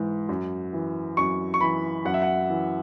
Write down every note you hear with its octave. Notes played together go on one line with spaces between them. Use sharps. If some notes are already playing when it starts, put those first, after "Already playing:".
Already playing: G#2 E3
F#2
E3
F#2 C#6
C#6
E3 B5
F#2 F#5
E5
F#5
E3